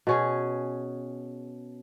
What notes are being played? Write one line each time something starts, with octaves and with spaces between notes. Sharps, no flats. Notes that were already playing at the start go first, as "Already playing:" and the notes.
B2 C#4 G#4